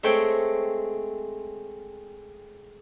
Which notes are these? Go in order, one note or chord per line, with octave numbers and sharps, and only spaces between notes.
G#3 A3 C4 C#5 G5